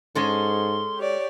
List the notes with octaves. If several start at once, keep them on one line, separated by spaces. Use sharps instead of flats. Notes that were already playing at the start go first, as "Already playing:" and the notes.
G#2 G#3 C#4 A4 C6
G4 C#5 D5